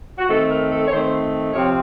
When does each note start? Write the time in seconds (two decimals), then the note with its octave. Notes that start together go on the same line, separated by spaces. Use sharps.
0.18 F#4
0.29 D#3 A3 C4 A4
0.50 A#4
0.71 A4
0.87 C#5
0.92 D#3 A3 C4 C5
1.53 C3 F3 C4 C#5